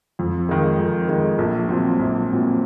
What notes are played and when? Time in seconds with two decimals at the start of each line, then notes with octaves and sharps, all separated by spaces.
0.19 F2
0.49 D#3 G#3
0.79 F2
1.09 D#3 G#3
1.38 A#1
1.69 A#2 F#3 C4
1.99 A#1
2.30 A#2 F#3 C4